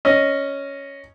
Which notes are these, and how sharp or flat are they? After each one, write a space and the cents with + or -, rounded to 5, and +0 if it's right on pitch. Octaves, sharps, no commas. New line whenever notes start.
C#4 +0 D#5 +0